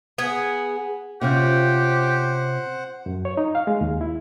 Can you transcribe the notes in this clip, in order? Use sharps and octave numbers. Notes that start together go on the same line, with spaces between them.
B3 G#4
C3 C#4 F4 G4 C5 F#5
F#2
C#5
D#4
F5
G#3
D#2
E4